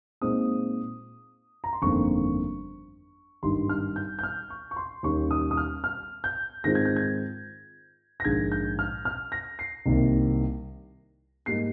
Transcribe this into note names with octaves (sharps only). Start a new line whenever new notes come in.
A#2 G#3 C4 D#4 D#6
A#5
C6
G1 F2 D#3 A#3 C#6
G#1 G2 D#3 G3 C6
F6
G6
G6
F6
C#6
C#6
C6
D#2 D#3 G3 C#4 C#6
D#6
D#6
F6
F6
G6
G#2 D#3 G#3 C4 F4 A#6
G#6
G6
G#6
A#6
A#1 G#2 D#3 G#3 D#4 G#6
G6
F6
F6
A#6
C7
C2 C3 D#3 A#3
G#2 G3 A#3 D#4 C7